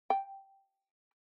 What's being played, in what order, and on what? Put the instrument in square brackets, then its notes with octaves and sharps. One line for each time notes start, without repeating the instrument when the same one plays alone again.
[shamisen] G5